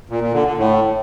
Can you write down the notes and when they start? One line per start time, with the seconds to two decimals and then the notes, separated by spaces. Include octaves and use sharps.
0.10 A#2
0.21 A#2
0.33 D3
0.45 D3
0.57 A2